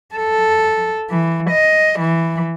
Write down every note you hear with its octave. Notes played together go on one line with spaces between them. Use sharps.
A4
E3
D#5
E3